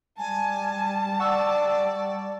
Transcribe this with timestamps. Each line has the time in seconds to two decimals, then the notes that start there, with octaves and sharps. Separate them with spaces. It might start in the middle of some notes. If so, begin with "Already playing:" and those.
0.19 G3 G#5 A5
1.19 D5 F#5 C#6 E6